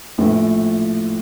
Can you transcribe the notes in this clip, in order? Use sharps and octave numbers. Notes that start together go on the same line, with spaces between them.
A#1 A2 F3 A3